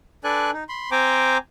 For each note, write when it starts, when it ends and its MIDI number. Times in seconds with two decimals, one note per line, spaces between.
0.24 0.51 62
0.24 0.51 69
0.24 0.51 71
0.24 0.51 74
0.24 0.51 80
0.24 0.51 90
0.53 0.64 63
0.69 0.90 83
0.69 0.90 84
0.92 1.38 60
0.92 1.38 72
0.92 1.38 79
0.92 1.38 80
0.92 1.38 82
0.92 1.38 86